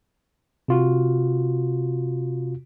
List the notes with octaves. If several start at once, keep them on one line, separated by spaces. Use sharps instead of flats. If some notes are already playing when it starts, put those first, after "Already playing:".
C3 F4 F#4